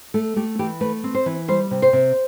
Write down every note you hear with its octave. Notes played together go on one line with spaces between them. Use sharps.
A3 A4
A3 G4
E3 G4
A3 B4
C4
C5
E3
G3 C5
C3
C5
C3